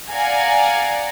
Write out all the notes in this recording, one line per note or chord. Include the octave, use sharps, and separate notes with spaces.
D5 F5 F#5 G#5 A#5